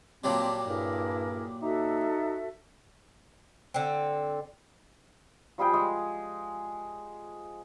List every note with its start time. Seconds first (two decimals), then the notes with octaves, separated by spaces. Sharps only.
0.24 A#2 F#3 G3 C4 G5 A5
0.66 G2 E4 G#4 A#4
1.62 D#4 F#4 A4 E5
3.74 D3 C4
5.58 F3 G3 G#4 G5
5.74 G#3